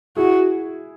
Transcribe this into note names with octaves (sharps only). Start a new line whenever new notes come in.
E4 F#4 G#4